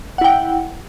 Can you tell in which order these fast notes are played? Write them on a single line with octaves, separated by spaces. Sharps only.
F#5 E4 G5